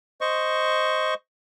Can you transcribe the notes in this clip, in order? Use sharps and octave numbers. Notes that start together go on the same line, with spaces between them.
C5 D#5 C#6